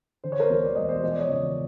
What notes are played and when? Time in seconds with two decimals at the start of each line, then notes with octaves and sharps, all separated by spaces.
0.24 D3 C5
0.32 C#5
0.40 A#4 C5
0.50 D2
0.63 D5
0.76 E1 D#5
0.89 C5 D5
1.03 F3 D#5
1.11 D5
1.20 C#5 D#5
1.29 C#3